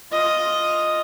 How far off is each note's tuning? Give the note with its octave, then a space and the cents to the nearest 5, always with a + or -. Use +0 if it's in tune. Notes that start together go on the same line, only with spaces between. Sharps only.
F4 +0 D#5 +0